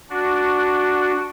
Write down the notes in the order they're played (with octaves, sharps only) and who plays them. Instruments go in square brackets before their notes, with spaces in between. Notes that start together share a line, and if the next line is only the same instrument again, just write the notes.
[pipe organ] D4 F#4